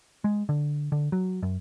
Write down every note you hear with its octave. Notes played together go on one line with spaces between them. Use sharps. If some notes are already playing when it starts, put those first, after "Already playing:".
G#3
D3
D3
F#3
F#2